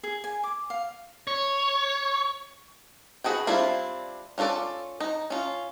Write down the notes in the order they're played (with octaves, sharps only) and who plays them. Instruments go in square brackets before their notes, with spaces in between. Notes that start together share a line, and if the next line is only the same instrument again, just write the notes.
[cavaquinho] G#4
G#5
D6
F5
[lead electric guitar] C#5
[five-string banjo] F#4 G#4 B4 G5
G3 C4 D4 E4 F4
C#4 F4 F#4 A4 D5
D#4
C#4 F4